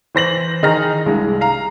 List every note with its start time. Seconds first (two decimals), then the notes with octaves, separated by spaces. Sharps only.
0.15 E3 C5 A#6 F#7
0.63 D#3 D#4 G#4 A#5 F6 A#6
1.06 C2 G2 G#3
1.41 F5 A#5